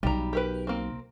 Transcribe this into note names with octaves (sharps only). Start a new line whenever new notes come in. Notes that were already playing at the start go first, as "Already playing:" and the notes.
B1 G3 A#5
G4 A#4 B4
A#3 C4